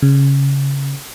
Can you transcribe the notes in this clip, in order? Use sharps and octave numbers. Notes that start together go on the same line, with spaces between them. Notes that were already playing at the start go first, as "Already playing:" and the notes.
C#3